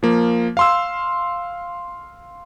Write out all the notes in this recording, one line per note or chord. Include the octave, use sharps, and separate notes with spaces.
F3 A#3
F5 C6 E6